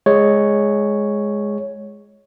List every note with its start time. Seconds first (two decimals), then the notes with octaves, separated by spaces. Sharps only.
0.06 G#3 C#5